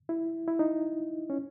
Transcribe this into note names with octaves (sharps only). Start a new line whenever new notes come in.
E4
E4
D#4
C#4